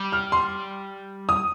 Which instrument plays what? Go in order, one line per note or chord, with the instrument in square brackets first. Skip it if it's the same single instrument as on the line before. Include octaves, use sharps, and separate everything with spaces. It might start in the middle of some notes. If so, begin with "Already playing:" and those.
Already playing: [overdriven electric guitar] G3
[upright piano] F6
C6
D#6